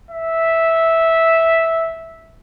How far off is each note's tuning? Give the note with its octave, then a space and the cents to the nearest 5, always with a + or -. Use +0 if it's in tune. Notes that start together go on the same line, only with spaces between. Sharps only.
E5 -5